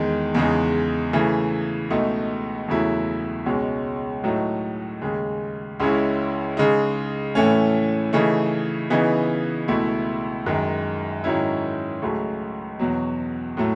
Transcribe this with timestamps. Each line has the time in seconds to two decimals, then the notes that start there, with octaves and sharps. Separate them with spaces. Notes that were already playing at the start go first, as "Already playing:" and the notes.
Already playing: E2 D#3 G#3
0.35 E2 C#3 G#3 D#4
1.13 C#3 E3 A3
1.90 C#2 B2 A3 D#4
2.68 E2 C#3 F#3 A3 E4
3.46 C#2 B2 G#3 C#4
4.24 A2 F#3 A3 D#4
5.01 D#2 C#3 G#3
5.80 C#2 C#3 G#3 C#4 E4
6.57 C#3 G#3 D#4
7.35 A2 E3 A3 C#4
8.13 C#3 E3 A3 D#4
8.90 C#3 E3 B3 D#4
9.68 C#2 B2 A3 E4
10.46 F#2 D#3 G#3
11.24 G#2 D#3 F#3 C#4 E4
12.02 C#2 C#3 F#3 A3
12.79 E2 B2 F#3
13.57 A2 F#3 A3